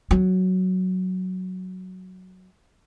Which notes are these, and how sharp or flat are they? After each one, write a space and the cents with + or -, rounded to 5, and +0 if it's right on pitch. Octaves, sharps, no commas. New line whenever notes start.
F#3 +0